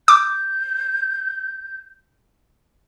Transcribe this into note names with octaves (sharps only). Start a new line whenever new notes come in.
D6 G6